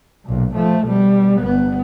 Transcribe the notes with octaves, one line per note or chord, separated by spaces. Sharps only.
B1 A#2
F3 A3
B2 G3
G1 B3